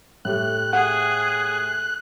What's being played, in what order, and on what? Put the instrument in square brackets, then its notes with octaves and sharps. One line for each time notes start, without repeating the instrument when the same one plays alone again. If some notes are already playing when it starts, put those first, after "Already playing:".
[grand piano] A2 G3 A3 [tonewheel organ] F#6
[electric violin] G#4 [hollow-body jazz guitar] F#5